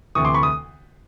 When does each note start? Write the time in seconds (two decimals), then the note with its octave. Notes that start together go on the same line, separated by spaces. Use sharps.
0.15 D2 C3 E3 C#6 D#6
0.25 C6 D6
0.34 B5 C#6
0.43 D#6